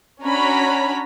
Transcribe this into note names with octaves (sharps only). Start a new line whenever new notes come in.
C#4 D4 F#4 C#5 A#5 B5